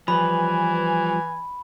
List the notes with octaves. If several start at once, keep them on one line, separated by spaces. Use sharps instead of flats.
E3 F3 G3 B4 G#5 B5